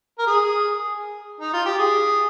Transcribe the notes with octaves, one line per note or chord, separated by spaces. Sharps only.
A#4
G#4
D#4
F4
G4
G#4